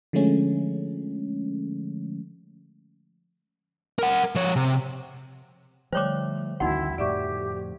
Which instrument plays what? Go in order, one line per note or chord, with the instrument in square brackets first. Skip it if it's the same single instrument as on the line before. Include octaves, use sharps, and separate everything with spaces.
[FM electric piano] D3 F3 G#3 A3 C#4
[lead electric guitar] A#4 F#5
F3 C#5
C3
[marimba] D3 G3 [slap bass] F3 A3 [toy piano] C5 C#5 D6
[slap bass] A1 D2 D#3 [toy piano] D#4 F#4 F#5 [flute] E4
[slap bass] F2 A2 F3 [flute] G4 [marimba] D5 E5 C#6